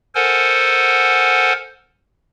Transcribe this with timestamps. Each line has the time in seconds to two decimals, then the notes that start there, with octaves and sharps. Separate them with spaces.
0.15 A4 A#4 C5 F#5 G#5